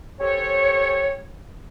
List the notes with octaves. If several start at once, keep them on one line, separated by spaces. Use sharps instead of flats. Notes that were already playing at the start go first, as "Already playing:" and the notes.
C#4 G4 A4 C5 C#5